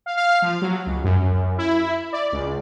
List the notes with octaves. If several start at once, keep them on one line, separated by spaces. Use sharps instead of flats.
F5
F5
F3
F#3
C#2
F#2
F#2
E4
D5
C#2